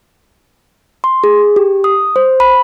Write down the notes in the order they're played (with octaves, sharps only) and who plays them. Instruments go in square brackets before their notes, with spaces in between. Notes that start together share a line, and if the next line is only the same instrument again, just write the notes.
[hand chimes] C6
G#4
G4
D#6
C5
B5